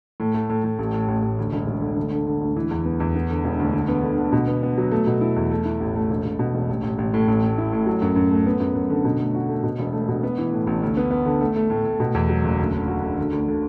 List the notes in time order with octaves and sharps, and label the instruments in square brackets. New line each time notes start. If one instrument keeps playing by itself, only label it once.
[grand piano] A2
A3
A2
A2
A1
A2
A1
A1
D2
E1
E1
D3
D2
D3
D3
D2
E3
E2
B3
E2
B3
D3
E1
D2
D3
B3
D3
D3
B2
B3
B3
F#3
A3
B2
E4
E2
A3
E4
A1
A3
E1
E1
B2
E1
A1
A1
A1
A2
A1
A2
E4
A2
F#3
F#2
F#2
A3
B3
F#2
F#2
D3
B2
A3
F#4
A3
B2
E1
A3
B2
B3
E3
A2
A1
D2
B3
B3
D3
A3
A3
A2
A2
B2
E2
F#3
F#1
D2
D3
F#4
D3
D3
D2
D3